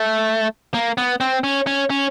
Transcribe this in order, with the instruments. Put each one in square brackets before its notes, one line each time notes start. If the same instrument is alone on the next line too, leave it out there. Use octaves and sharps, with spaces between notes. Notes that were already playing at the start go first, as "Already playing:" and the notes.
Already playing: [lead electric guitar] A3
A#3
B3
C4
C#4
C#4
C#4